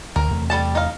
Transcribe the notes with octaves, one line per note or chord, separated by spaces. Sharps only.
D2 A#4
E2 C3 A3
G3 A4 A5
D#4 F5